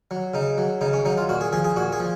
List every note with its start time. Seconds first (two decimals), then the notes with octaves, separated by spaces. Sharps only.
0.11 F#3
0.34 C#3 D#4
0.58 F#3
0.81 C#3 D#4
0.93 C#4
1.05 F#3 D#4
1.17 F4
1.29 A#2 F#4
1.41 G#4
1.53 F3 G#4
1.64 G#4
1.76 A#2 F#4
1.92 G#4
2.00 F3